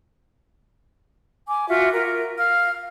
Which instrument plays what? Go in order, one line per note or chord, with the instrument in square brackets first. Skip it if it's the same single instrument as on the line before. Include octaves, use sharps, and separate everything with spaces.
[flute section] G#5 D6
F4 F#4 E5
F4 A#4
F5 F6